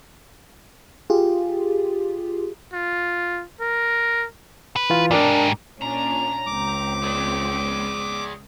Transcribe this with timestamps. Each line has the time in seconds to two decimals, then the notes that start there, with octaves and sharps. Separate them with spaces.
1.10 F4 G4 G#4
2.73 F4
3.61 A#4
4.76 B4
4.90 E3 F4
5.11 G#2 D4 G4 A#4 D5
5.81 A#2 C#4 D4 A#5
6.46 C#2 C4 D6
7.02 G#4 D5